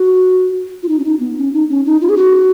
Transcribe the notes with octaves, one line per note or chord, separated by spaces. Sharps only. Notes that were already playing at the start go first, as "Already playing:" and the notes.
Already playing: F#4
F4
D#4
C#4
D#4
B3
C#4
D#4
C#4
D#4
F4
G#4
F#4